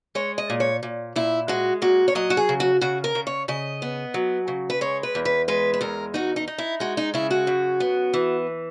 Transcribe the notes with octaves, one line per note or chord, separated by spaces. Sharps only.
G#3 C#5
D#5
A#2
C#5
A#2
A#2 E4
G#3 F#4
A#2 F#4
C#5
F#3 D#5
F#4
G#4
C#3
F#4
C#3 F#4
A#4
C#3
C#5
C#3 D#5
B3
F#3
C#3
B4
G#3 C#5
B4
E2
B4
G#3 B4
B4
E2 A#4
D#4 F#4
D#4
D#4
E4
G#3 F#4
D#4
C#3 E4
F#4
F#2
B3
E3